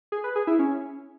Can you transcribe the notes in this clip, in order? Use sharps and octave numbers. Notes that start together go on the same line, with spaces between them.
G#4
B4
G#4
E4
C#4